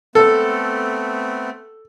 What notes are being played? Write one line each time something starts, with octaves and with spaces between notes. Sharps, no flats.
A3 B3 C4 A4